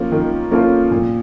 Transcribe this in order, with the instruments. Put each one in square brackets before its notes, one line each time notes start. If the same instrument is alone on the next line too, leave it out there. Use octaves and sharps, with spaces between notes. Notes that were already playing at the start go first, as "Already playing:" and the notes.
Already playing: [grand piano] F3 [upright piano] A#3 C#4 F4 A4
[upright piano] D#3
A#3 C#4 F4 A4
A#2